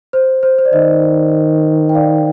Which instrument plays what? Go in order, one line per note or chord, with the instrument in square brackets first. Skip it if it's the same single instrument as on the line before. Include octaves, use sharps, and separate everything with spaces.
[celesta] C5
C5
C5
D5
[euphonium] D#3 [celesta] C5 D#5
[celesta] G5
D5 F5